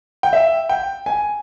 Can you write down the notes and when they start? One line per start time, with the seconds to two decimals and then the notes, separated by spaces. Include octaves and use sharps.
0.23 G5
0.33 E5
0.69 G5
1.06 G#5